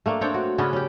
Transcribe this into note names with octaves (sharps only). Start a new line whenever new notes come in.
A3 A#3 D4
C4 D4 C#5 G5
F#4
C#3 B3 C#4 D4
C#4 G4